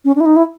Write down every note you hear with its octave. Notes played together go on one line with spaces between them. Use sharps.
C#4
D4
E4
D#4
E4